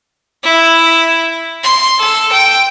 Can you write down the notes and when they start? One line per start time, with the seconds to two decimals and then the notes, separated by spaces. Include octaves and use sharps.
0.44 E4
1.64 C6
1.99 A4
2.33 G5